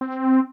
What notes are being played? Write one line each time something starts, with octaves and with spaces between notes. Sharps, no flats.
C4